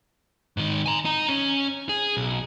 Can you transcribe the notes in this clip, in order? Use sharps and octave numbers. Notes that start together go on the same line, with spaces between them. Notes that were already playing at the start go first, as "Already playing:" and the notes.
G#2 D#3
G#5 A#5
D#4 A#5
C#4
G#4
B1